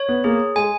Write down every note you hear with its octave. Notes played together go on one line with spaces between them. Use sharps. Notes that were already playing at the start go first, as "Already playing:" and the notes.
Already playing: C#5
B3
A#3 G#4
G#3 G#5